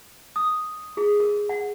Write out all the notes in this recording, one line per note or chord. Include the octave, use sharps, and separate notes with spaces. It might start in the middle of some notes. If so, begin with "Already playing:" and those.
D#6
G#4
A#4
F#5